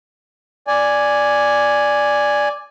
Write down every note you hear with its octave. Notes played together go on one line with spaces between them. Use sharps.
D5 G#5